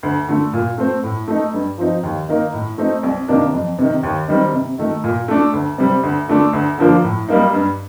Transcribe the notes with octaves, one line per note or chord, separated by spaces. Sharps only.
D2
D3 A3
A#2
A3 C4
A2
A3 D#4
G2
F3 C4 D#4
D#2
D#3 A#3 D#4
A2
A3 C4 D#4
C2
C3 D#3 A#3 D4
F2
C3 D#3
D#2
D#3 G3 C4
C3
D#3 A3
A#2
A3 D4
D2
C3 G3 C4
D2
D3 A3 D4
D2
D3 F3 A#3 D4
A2
G3 A#3 D#4
G2